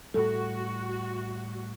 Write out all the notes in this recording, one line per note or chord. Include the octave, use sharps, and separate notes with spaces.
A2 G3 F#4 A4